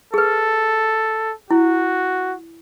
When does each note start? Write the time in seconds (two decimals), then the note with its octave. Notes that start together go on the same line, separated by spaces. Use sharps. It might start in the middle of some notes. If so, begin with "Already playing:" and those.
0.14 G#4 A4 B4
1.51 E4 F#4